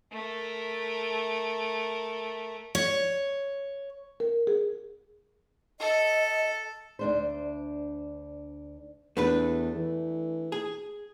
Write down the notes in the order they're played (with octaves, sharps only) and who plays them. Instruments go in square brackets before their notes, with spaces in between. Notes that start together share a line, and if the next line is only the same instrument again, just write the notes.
[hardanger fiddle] A3 A#4
[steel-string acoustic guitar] C#5
[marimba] A#4
G#4
[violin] A4 [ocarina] D#5
[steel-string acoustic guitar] D2 D4 C5
[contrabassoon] E2 [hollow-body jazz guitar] A3 D4 B4
[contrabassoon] E3
[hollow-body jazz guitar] G#4